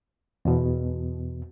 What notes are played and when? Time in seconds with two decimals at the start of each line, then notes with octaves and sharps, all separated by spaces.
0.45 E2 B2